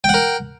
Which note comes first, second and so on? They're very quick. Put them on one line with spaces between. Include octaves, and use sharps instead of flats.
G5 F#5 A#4